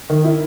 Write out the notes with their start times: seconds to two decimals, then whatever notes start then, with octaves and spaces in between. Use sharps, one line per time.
0.10 D#3
0.24 E4